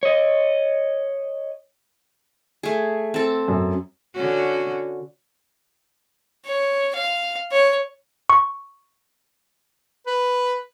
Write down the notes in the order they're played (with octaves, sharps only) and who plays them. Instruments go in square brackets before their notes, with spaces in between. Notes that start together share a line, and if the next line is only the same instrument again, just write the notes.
[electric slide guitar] C#5 D#5
[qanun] A3 G#4
C4 A4
[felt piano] F#2
[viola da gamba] D3 C#4 F#4
[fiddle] C#5
F5
C#5
[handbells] C#6
[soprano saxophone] B4